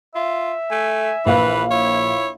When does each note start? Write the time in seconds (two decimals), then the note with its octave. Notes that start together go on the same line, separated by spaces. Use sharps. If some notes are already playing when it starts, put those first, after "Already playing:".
0.15 F4 E5
0.71 A3 G#5
1.26 A#1 E3 B4 F5
1.71 E4 C#5